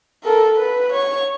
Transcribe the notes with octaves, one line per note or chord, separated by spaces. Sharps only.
A4 A#4
B4
C#5 C#6